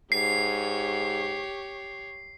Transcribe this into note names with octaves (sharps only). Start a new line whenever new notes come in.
G#2 G4 C#5 C7